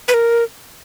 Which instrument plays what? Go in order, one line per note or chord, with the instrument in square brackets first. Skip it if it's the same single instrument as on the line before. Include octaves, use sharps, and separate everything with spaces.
[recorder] B4
A#4